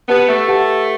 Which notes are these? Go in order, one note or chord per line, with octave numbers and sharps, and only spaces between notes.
B3 G4 B4 F#5 A5
A3
G4 B4 F#5 A5